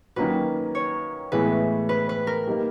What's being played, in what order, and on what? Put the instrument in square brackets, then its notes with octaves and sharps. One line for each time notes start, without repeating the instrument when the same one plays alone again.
[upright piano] D#3 F#3 A#3 C#4 F#4 [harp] B4
[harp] C#5
[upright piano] A2 E3 G#3 B3 E4 [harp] B4
[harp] B4
B4
A#4
[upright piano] G3 A#3 D#4